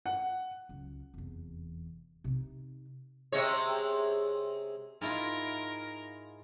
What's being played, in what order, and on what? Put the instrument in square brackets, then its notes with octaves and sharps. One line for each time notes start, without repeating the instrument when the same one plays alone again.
[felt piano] F#5
[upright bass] C#2 F#3
F1 E2
C3 D#4
[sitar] C3 G#3 C#5
[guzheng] G#2 E4 F4 [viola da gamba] A#4